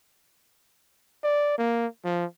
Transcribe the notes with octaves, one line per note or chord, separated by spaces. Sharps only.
D5
A#3
F3